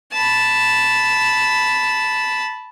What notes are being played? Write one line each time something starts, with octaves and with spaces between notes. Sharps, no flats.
A5 B5